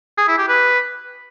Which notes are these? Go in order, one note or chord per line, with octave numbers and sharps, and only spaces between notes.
G#4
E4
G4
B4